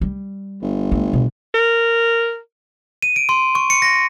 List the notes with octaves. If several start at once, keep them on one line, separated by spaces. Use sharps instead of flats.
G3
G1
G#3 A3
B2
A#4
D#7
D7
C6
C#6
C#7
A#6